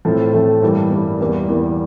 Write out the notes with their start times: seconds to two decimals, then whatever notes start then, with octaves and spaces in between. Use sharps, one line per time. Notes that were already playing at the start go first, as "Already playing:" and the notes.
0.05 A2 F3 A3 C4
0.33 A2 F3 A3 C4
0.62 G2 E3 G3 A#3
0.91 G2 E3 G3 A#3
1.20 E2 E3 G3 A#3
1.49 E2 E3 G3 A#3